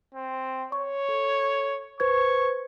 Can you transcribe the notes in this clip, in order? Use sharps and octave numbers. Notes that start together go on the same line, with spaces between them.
C4
C#5 C#6
A4
B4 C5 C#6 G#6